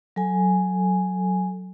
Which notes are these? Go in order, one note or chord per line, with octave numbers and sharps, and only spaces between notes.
F#3 A4 G#5